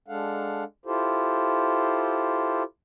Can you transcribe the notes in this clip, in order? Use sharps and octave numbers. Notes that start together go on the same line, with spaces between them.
G#3 D4 A4 F5 F#5
E4 F4 G4 A4 C5